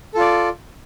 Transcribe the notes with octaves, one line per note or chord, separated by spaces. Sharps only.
F4 A4 D5